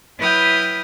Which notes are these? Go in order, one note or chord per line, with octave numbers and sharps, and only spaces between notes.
F#3 E4 B4 G5 D#6 F6